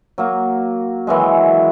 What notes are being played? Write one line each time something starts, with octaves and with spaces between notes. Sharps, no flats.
F#3 A#3
D#3 E3 F#3 G#3